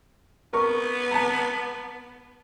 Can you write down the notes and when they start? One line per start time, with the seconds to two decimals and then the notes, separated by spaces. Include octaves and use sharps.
0.53 B3 A#4 C#6
1.11 A5 A#5